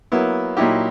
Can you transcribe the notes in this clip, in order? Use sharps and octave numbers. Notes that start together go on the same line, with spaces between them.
F#3 A#3 B3 E4
A#2 F#3 D#4 E4 G4